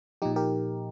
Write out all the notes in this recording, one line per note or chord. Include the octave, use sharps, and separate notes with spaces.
A#2 F3 D#4 G4
G4 A#4